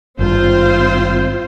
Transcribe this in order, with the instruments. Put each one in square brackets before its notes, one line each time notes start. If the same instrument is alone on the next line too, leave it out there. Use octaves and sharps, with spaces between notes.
[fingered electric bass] G#1 G2 [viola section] C4 F4 C5